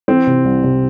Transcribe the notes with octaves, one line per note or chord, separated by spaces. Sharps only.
E3 C4
C3
C2
C3